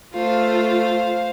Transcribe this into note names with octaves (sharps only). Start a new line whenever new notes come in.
A3 F4 C5 F5